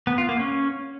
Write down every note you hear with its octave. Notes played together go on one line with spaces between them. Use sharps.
B3
F4
A#3
C#4